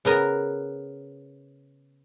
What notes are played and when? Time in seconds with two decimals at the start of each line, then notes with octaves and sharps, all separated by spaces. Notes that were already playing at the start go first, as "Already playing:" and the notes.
0.05 C#3 B3 A#4